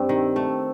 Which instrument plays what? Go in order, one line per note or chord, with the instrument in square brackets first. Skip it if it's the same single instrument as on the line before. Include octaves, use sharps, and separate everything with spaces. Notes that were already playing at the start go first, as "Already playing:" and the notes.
Already playing: [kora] G2 [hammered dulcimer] C4
[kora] D#3
A3